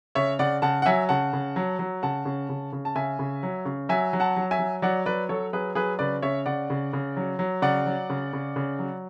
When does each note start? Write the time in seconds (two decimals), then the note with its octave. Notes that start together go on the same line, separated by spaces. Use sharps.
0.15 C#3 C#5 E5
0.39 C#3 D5 F#5
0.62 C#3 F#5 A5
0.82 F#5
0.86 F#3 E5 G#5
1.09 C#3 F#5 A5
1.33 C#3
1.56 F#3
1.79 F#3
2.03 C#3 F#5 A5
2.25 C#3
2.49 C#3
2.73 C#3
2.85 A5
2.95 C#3 E5 G#5
3.19 C#3
3.43 F#3
3.65 C#3
3.89 F#3 E5 G#5
4.13 F#3
4.20 F#5 A5
4.36 F#3
4.51 E5 G#5
4.59 F#3
4.82 F#3 D5 F#5
5.06 F#3 B4 D5
5.29 F#3 A4 C#5
5.53 F#3 G#4 B4
5.75 F#3 G#4 B4
5.99 C#3 B4 D5
6.22 C#3 C#5 E5
6.46 C#3 D5 F#5
6.70 C#3
6.93 C#3
7.17 F#3
7.39 F#3
7.62 C#3 D5 F#5
7.86 F#3
8.10 C#3
8.33 C#3
8.56 C#3
8.79 F#3